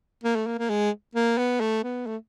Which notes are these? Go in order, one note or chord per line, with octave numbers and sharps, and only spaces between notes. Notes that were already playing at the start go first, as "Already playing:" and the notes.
A#3
A3
A#3
A#3
G#3
A#3
B3
A3
B3
A3